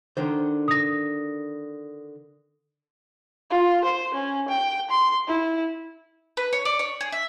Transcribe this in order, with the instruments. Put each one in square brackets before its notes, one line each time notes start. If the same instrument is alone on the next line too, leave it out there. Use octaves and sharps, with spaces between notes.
[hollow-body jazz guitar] D3 D#3 C5
[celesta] D#6 A#6
[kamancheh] F4
C5
C#4
G5
C6
E4
[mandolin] B4
C#5
D5
C#5
G#4
E5